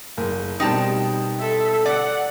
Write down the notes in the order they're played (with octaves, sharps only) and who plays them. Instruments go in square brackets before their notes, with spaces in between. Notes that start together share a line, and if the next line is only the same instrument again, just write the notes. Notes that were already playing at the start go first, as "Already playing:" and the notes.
[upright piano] F#1 A#4
[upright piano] B2 G3 C4 [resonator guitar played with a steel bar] D#4 G5 A5
[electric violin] A4 E5
[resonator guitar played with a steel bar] D5 [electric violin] F#5